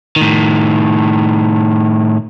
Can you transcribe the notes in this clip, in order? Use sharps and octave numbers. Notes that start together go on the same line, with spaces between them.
A2 D#3